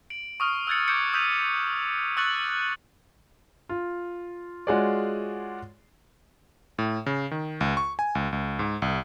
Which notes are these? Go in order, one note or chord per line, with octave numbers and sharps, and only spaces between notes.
D7 F#7
C#6 D#6 F6
E6 F#6 G#6 A6 C#7
D6 G6 G#6 C#7 D7
D#6 E6 G6 B6 D#7 F7
C#6 E6 F#6 A6 C#7 F#7
F4
G#3 F4 F#4 G#4 C#5 D5
A2
C#3
D#3
C#2
C#6
G#5
C#2
C#2
G#2
C2